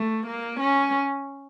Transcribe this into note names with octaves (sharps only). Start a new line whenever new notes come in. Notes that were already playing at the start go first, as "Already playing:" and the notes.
Already playing: A3
A#3
C#4